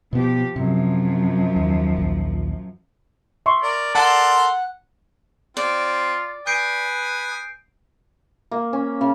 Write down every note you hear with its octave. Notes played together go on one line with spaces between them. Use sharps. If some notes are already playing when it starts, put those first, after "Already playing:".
B2 F3 B3 G4
F#2 C3 F3
D#2
A#1 D#2
E5 C6 C#6
A#4 D5
A4 A#4 F#5 A5 C6
C4 F4 D5
B4 G#5 D#6 G6 C7 D7
A#3
C#4
C#3